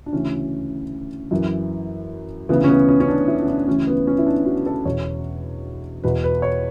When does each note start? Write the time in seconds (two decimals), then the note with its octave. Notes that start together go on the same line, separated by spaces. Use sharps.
0.06 D4
0.13 D2 C#3 E3 C#4
1.31 F#2 E3
2.49 D2 C#3 E3 B3
2.64 C#4
2.68 B3
2.89 C#4
3.00 C#4
3.08 D4
3.28 E4
3.41 C#4
3.48 D4
3.68 D2 C#3 E3 C#4
3.87 B3
4.07 C#4
4.18 E4
4.26 D4
4.45 F#4
4.66 A4
4.85 E2 B2 C#5
6.04 E2 B2 B4
6.24 B4
6.42 C#5